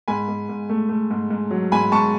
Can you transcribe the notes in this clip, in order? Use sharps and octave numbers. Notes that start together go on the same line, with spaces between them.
G#2 G#5 B5
G#2
G#2
A3
A3
G#2
G#2
F#3
G#2 G#5 B5
G#2 A5 C#6